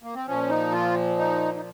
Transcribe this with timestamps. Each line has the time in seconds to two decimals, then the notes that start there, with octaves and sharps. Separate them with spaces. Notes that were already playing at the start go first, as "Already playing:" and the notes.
0.03 A#3
0.15 C4
0.26 A#2 F3 C#4
0.49 D#4
0.72 F4
1.17 D#4
1.54 D#4